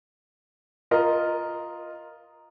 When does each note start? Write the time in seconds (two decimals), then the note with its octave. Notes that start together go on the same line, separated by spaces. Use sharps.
0.91 F4 A#4 D#5